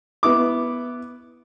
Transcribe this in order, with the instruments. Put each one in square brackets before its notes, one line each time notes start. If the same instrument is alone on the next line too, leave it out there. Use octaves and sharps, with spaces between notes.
[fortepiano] B3 E4 D6